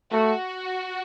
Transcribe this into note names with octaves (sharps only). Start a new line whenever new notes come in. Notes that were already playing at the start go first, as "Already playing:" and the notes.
A3 F#4